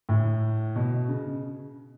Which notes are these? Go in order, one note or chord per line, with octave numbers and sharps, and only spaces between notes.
A2
B2
C#3